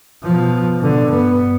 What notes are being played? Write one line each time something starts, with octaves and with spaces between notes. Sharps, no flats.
B2 F3
B2 D3
G2 B3